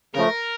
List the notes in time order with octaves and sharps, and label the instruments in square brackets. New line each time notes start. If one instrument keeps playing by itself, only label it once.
[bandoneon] C#3 F3 A3 [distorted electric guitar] A#4